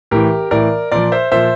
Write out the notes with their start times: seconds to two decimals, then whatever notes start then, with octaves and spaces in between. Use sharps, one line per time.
0.11 A2 E3 G4 A#4
0.51 A2 E3 A#4 D5
0.92 A#2 F3 A#4 D5
1.12 C5 E5
1.31 A#2 F3 C5 E5